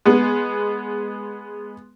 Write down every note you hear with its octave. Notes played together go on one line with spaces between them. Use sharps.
G#3 B3